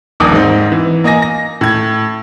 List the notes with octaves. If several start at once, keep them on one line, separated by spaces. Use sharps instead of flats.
D#1 A#1 D#2 D6 D#6
G#2 C4 D#4
E3
A#3 D#5 G#5 A#6
A#6
A2 G#6